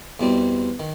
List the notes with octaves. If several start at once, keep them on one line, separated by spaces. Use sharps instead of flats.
E2 B2 G3 C4
D#3